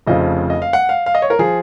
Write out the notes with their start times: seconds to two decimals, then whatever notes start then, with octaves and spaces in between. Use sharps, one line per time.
0.07 F1 F2 C#3 F3 D#5
0.50 D#5
0.62 F5
0.73 F#5
0.89 F5
1.06 F5
1.15 D#5
1.22 C#5
1.30 A#4
1.39 F3 G#4